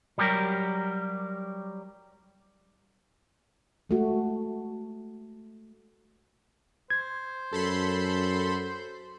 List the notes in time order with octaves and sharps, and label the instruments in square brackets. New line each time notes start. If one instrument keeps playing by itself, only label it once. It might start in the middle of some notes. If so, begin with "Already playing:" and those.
[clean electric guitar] F#3 G3 G4 A4 A#4
[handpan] G#3 A3 F#4
[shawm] C5 [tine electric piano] G#6
[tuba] F#2 [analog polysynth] A4 B5 C6